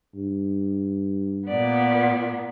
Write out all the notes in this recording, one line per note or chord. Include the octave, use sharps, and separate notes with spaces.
G2
A#2 B3 D5